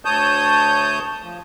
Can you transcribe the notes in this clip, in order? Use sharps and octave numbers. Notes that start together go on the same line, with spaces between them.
D2 C#5 A5 D#6 G6
F3